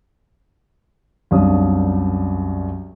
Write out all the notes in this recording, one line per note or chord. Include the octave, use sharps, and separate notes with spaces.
C2 F#2 D4 F5 D#6